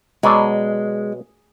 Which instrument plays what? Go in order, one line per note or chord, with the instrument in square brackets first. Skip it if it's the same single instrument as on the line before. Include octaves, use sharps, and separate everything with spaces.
[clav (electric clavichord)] B2 F#3 D5 [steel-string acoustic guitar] G#3